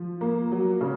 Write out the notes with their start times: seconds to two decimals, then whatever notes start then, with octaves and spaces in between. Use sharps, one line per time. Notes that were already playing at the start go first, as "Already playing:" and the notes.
Already playing: F3
0.21 A#3
0.52 F#3
0.81 C#3